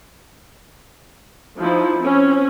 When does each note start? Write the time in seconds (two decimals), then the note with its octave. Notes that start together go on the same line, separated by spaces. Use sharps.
1.60 F3 D#4 E4
2.01 C4 C#4